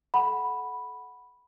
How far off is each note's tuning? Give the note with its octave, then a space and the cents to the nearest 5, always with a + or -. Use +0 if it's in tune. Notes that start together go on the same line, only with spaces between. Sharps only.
A4 -35 F#5 +0 B5 -5